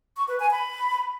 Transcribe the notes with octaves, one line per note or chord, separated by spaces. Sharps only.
C#6
B4
G#5
B5